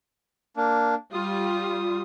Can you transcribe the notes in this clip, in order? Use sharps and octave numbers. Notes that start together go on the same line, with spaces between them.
A#3 D4
G3 F4 D#6